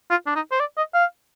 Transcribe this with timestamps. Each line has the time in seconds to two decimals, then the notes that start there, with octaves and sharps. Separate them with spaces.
0.11 F4
0.27 D4
0.36 D#4
0.52 C5
0.60 D5
0.78 D#5
0.94 F5